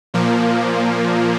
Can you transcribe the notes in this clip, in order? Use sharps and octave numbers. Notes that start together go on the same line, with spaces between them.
A#2 F3 A#3